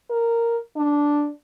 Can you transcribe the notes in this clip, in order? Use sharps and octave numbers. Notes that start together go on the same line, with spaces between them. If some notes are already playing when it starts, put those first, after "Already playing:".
A#4
D4